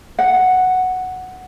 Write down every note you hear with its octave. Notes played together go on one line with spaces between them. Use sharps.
F#5